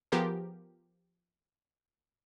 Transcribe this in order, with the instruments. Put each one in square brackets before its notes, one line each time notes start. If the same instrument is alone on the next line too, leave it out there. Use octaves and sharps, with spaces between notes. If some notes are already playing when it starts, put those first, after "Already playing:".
[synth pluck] F3 B3 G4 G#4 A#4 C5